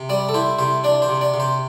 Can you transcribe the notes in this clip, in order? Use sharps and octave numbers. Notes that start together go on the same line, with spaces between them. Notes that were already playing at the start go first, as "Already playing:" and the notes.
Already playing: C3
G3 D5
A4
E4 C5
C3 C5
D4 D5
C5
C3
D5
C3
C5